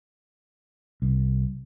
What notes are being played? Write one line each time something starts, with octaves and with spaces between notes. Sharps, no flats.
C2